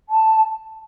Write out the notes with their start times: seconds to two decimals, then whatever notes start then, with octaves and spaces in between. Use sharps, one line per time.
0.09 A5